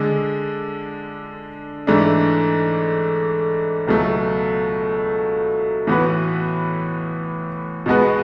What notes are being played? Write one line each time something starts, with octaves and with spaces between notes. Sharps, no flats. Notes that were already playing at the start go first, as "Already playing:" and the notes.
Already playing: D3 G#3 D4
G#2 E3 A3 D4
C#2 B2 F#3 A3
A2 E3 B3 F#4 B4
B2 G#3 B3 F#4 B4